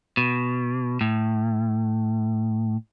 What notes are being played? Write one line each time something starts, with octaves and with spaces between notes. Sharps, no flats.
B2
A2